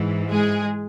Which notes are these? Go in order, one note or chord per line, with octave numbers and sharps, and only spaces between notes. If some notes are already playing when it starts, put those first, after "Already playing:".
Already playing: G#2 E3
G#3 G#4